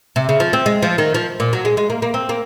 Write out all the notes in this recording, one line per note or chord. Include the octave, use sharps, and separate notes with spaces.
C3
C#3
F3
C4
G#3
F3
D#3
F3
A#2
F#3
G#3
G#3
A#3
A#3
C4
A#3